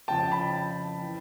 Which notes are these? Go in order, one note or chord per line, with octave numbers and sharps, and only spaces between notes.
F2 C#3 F3 G5 A5
A5 B5
E3